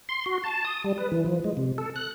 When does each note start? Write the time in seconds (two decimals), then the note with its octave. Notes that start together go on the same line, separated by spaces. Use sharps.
0.09 C6
0.26 F#4
0.44 A5
0.65 D#6
0.84 G3
0.98 B4
1.12 E3
1.26 F3
1.44 G#3
1.57 C3
1.78 A4
1.96 F#6